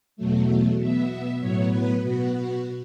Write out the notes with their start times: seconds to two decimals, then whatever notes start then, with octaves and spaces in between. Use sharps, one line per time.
0.17 E2 B2 F#3 A3
0.79 B2 B3 E5
1.41 A2 F#3 B3 C#5
1.71 B4
2.03 B2 B3 F#4